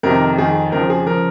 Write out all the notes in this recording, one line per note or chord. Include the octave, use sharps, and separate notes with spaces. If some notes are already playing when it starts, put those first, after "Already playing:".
F2 C3 D#3 A#4
F2 D#3 G#4
F2 C#3 F3 A#4
G#4
C#3 F3 A#4